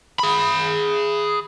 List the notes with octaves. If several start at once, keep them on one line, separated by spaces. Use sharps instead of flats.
G#4 B5